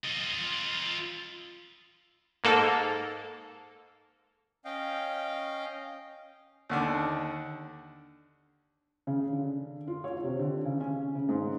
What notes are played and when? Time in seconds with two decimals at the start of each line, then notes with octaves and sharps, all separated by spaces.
0.04 F4 D#5
2.44 G#2 A#3 A4
4.65 C#4 D#5 F5 G5
6.69 D#2 D3 D4
9.07 C#3
9.33 D3
9.87 F4
10.04 C#5
10.24 C3
10.39 D3
10.65 C#3
10.80 C#4
11.15 C#3
11.29 G#2